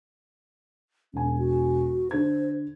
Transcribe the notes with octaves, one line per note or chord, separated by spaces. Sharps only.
E1 C#4 G#5
F#4
D3 C5 G#6